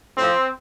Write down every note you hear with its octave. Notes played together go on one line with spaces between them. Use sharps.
A2 F3 C4